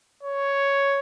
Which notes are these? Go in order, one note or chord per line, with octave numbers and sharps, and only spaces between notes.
C#5